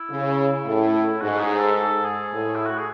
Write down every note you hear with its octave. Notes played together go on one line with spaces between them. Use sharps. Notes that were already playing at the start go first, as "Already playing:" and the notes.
Already playing: E4
C#3
A2
G#2 F#4
G#4
A4
A4
G#4
A2
E4
F#4
G#4